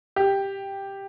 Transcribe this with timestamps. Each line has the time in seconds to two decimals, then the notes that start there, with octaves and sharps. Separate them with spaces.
0.16 G4